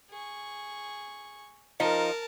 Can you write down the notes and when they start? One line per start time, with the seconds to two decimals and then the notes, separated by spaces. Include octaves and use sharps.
0.10 G#4 C#6
1.80 F3 D#4 A#4 A5